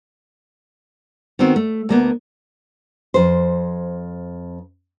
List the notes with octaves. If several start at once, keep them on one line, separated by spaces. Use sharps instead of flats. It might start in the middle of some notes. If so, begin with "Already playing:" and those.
D#3 B3 C4 F#4
A3
D2 A#3 B3
F2 C5